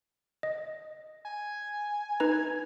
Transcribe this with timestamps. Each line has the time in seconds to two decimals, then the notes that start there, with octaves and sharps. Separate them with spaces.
0.43 D#5
1.25 G#5
2.20 D#4 B4 A#5